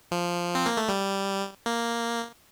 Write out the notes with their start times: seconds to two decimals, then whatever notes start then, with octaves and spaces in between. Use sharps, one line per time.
0.11 F3
0.55 C4
0.66 A#3
0.77 A3
0.88 G3
1.66 A#3